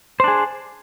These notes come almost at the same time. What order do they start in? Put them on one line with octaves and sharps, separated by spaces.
C5 D4 G#4